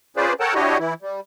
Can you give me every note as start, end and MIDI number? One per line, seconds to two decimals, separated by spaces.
0.17 0.33 61
0.17 0.33 65
0.17 0.33 68
0.17 0.33 71
0.17 0.33 72
0.17 0.33 74
0.40 0.54 69
0.40 0.54 70
0.40 0.54 73
0.40 0.54 78
0.40 0.54 79
0.40 0.54 81
0.55 0.78 62
0.55 0.78 64
0.55 0.78 66
0.55 0.78 67
0.55 0.78 73
0.55 0.78 75
0.79 0.94 52
0.79 0.94 64
1.02 1.20 55